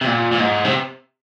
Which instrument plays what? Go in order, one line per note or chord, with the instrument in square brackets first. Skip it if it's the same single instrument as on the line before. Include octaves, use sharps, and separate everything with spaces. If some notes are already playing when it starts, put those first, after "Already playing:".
[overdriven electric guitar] C3
A#2
A#2
G#2
C3